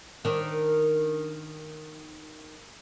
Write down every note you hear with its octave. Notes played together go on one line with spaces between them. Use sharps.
D#3 D4